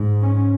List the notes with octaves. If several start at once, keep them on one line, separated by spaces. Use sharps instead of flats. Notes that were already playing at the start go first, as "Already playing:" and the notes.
Already playing: G#2
C#4